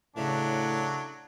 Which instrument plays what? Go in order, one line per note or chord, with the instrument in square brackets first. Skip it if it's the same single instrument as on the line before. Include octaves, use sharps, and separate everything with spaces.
[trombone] A2 [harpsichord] C#3 E3 [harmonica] F#3 D4